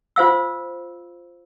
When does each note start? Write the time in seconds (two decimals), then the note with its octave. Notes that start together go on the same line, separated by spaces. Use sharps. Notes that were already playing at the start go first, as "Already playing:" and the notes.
0.16 F4 C5 F5 E6